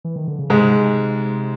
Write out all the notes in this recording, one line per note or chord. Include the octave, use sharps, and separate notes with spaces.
E3
D#3
D3
C#3
G#2 C3 G#3